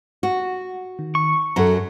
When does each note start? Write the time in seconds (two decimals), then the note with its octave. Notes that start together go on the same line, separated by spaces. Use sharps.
0.23 F#4
0.99 D#3
1.15 C#6
1.56 F#2 F#3 A4 F#5 A#5